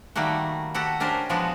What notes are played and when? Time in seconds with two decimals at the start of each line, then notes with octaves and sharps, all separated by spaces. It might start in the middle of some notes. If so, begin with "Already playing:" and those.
0.16 D#3 G3 A3 A#3 F#4
0.74 F#4 G4 A4 F#5
1.00 C#4 D4 G4 A#4 C5
1.29 F3 G#3 B3 D4 F#4